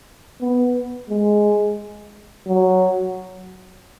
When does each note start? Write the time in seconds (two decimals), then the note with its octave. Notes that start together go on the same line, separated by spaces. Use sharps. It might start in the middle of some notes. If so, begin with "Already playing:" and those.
0.41 B3
1.10 G#3
2.47 F#3